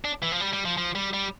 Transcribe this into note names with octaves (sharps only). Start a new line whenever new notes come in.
D4
E3
F3
G3
G3
F3
F3
G3
G3